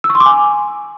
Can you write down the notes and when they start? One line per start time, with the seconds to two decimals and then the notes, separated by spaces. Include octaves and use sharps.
0.04 E6
0.10 C#6
0.15 C6
0.20 D6
0.26 G#5